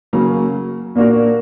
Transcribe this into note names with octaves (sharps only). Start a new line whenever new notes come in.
C#3 F#3 A#3
A#2 A#3 D4 F#4 A#4